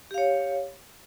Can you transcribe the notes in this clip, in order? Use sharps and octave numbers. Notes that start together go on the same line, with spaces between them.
G4 C#5 F5